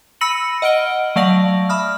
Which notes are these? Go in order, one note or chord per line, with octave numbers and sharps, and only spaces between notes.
B5 E6 A#6 C#7 D#7 F#7
D#5 F#5 F6 D7 G7
F#3 A3 D5 F5 A#6 F#7
E5 B5 D#6 F6